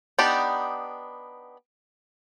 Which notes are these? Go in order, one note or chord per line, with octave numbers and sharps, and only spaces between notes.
B3 D4 D#4 G4